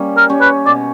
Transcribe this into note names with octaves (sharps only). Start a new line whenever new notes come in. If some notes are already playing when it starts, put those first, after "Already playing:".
Already playing: G3 A#3 C#4
A#4
C#4 G4 C#5
B4
B2 D5